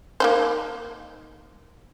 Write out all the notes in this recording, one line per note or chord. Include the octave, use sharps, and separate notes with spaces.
A#3 D#4 C5